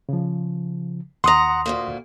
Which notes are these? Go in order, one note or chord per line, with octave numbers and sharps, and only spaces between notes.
C#3 F3
D#2 F#5 A#5 C6 D#6 A#6
D2 A#2 A#3